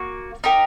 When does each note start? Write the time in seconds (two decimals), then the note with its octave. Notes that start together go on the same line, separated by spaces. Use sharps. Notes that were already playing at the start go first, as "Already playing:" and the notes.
Already playing: A#3 F#4
0.44 D#4 G4 A#4